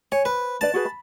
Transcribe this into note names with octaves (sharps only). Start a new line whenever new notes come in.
C#5 G#5
B4 C5
D4 B4 D5 A5
F#4 G#4 B4
B5